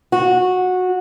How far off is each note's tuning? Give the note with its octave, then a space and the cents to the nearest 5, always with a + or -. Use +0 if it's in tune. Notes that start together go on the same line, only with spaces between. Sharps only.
F#4 -15